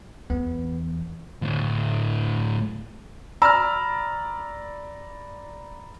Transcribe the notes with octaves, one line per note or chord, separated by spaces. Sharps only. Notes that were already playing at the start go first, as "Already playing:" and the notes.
E2 B3
D2 A2
D5 A#5 B5 E6 F6